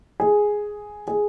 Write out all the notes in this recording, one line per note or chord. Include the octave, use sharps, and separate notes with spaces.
G#4
G#4